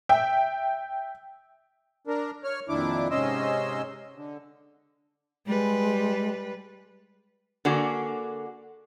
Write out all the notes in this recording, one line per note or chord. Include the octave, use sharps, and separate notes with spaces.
E5 G5
D4 A#4
C#5 F6
F2 A#2 D#3 D4 E4 D6
G#2 C3 C#4 D#5 C6 E6
D3
G3 G#3 B4
D3 A#3 F#4 G#4 D5